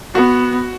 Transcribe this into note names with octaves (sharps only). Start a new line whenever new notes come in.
B3 F#4